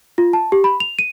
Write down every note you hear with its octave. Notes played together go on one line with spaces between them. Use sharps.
F4
A5
G4
B5
F7
D#7